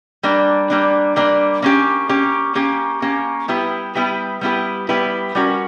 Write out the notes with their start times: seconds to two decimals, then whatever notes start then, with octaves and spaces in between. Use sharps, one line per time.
0.23 G3 A#3 D4
0.70 G3 A#3 D4
1.16 G3 A#3 D4
1.62 A#3 C#4 G4
2.09 A#3 C#4 G4
2.55 A#3 C#4 G4
3.02 A#3 C#4 G4
3.48 G3 B3 E4 G4 B4
3.95 G3 B3 E4 G4 B4
4.41 G3 B3 E4 G4 B4
4.89 G3 B3 E4 G4 B4
5.35 G3 C#4 F#4 A#4